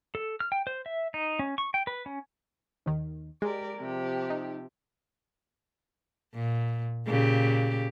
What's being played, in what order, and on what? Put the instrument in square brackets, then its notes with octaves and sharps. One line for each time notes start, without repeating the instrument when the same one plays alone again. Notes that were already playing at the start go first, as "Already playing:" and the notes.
[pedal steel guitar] A4
F6
G5
C5
E5
D#4
C#4
C#6
G5
B4
C#4
[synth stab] D#2 D#3
[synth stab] G#3 [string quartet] G4 A#4 D5
[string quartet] C3 F3 G4
[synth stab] D#4
[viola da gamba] A#2
A#2 C#3 G4